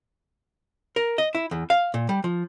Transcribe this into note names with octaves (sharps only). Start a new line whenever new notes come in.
A#4
D#5
E4
E2
F5
A#2
G3
F3